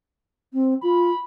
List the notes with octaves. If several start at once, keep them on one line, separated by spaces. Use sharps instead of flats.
C4
F4 B5